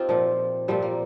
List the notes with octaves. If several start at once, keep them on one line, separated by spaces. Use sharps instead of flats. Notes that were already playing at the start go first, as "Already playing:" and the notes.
Already playing: C4 D#4 F4 G4
A#2 F3
A#2 F3 G3 C4
A#3